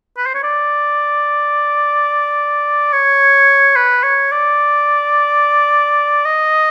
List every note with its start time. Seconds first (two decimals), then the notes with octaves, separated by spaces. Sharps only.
0.17 B4
0.26 C5
0.34 C#5
0.43 D5
2.93 C#5
3.76 B4
4.03 C#5
4.32 D5
6.25 D#5